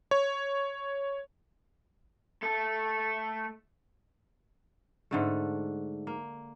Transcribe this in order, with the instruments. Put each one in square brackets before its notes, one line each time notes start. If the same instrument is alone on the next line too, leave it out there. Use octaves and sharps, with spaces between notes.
[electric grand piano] C#5
[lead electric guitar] A3 A4
[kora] G#2 D3 A3
A#3